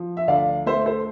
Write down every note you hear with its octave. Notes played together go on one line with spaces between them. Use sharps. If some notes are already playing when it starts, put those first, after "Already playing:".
Already playing: F3
E5
D2 D5 F5
A3 C5 E5
A4 C5